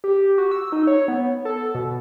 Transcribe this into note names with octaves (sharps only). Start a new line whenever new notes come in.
G4
F#4
E6
D#4
C#5
B3
A4
B2